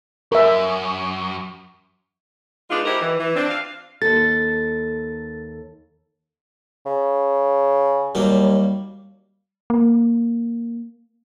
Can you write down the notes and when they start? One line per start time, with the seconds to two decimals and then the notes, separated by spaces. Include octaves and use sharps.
0.32 F#2 A#4 E5
2.70 G#3 B3 D4 D#4 F4
2.85 D#4 E4 G4 A#4 C5
3.00 E3
3.18 E3
3.35 C4 D4
3.48 F5
4.02 D#2 A4 A6
6.86 C#3
8.15 D#2 F#3 G3 A#3
9.70 A#3